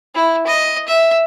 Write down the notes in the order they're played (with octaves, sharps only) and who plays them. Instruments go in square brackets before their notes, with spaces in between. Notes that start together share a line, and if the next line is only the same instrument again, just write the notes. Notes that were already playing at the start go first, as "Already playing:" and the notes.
[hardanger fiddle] E4
D#5
E5